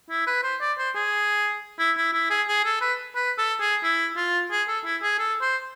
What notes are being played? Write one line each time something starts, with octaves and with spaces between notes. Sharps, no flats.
E4
B4
C5
D5
C5
G#4
E4
E4
E4
G#4
G#4
A4
B4
B4
A4
G#4
E4
F4
G#4
A4
E4
G#4
A4
C5